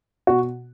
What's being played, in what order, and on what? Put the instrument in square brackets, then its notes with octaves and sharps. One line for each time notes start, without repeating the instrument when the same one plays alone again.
[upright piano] B2 F#4